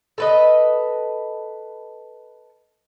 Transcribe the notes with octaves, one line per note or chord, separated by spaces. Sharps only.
A4 B4 D#5